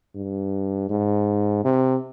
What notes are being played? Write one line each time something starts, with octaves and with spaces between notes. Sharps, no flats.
G2
G#2
C3